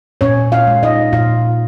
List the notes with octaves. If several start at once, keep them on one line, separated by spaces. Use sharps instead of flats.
A#2 C#4 C#5
F4 F5
G#3
D#4 D#5
A#2 F4 F5